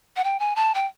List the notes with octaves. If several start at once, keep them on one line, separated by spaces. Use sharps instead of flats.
F#5
G5
G#5
A5
G5